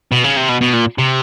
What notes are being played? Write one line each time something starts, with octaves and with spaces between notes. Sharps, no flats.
B2
C#3
C3
B2
B2
A#2
C3